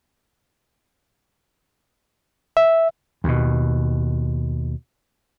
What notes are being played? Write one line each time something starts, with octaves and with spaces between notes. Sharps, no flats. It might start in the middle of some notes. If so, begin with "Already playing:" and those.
E5
D#2 B2